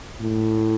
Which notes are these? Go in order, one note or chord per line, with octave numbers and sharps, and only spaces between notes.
A2